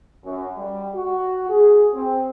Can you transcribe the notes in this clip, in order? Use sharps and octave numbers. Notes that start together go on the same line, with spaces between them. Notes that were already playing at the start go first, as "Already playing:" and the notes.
F#2
G3
F#4
G#4
C4